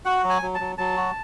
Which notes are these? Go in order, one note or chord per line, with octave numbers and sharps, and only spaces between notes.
F#4 F#5
F#3
G#5
F#3
A5
F#3
F#3 A5
F#4